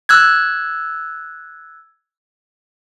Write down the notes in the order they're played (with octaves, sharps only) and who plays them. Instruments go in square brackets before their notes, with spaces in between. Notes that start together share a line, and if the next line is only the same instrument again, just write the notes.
[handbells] E6 F#6 G#6